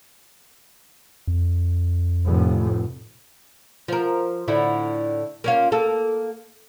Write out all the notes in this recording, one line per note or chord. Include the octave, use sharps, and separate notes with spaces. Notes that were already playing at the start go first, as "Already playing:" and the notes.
F2
F1 A2
F3 A#4
A2 D3 E4
A#3 C#4 F4
A#3 A4